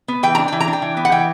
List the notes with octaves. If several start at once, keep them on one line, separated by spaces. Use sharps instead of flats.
B3
E3 G5
A#5
D4
E3 G5
A#5
D4
G5
E3
B3
F#5
E3 G5